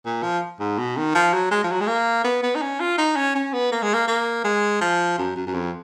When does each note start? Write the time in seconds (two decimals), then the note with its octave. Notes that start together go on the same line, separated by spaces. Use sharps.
0.06 A#2
0.23 F3
0.60 G#2
0.79 B2
0.97 D#3
1.15 F3
1.33 F#3
1.51 G#3
1.64 F3
1.72 F#3
1.81 G#3
1.88 A#3
2.24 B3
2.43 B3
2.55 D#4
2.62 C#4
2.80 F4
2.98 D#4
3.16 C#4
3.35 C#4
3.53 B3
3.72 A#3
3.82 G#3
3.94 A#3
4.08 A#3
4.44 G#3
4.81 F3
5.18 F#2
5.36 F#2
5.47 F#2
5.54 F2